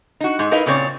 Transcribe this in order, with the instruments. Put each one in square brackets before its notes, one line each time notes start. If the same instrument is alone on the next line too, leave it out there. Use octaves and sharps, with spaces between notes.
[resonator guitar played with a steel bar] D#4 F#4
G#2 G#4
D#4 E4 A#4 B4 D#5 F5
A#2 C#3 C4 C#5 D5